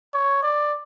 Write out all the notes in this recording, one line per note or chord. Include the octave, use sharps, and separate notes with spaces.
C#5
D5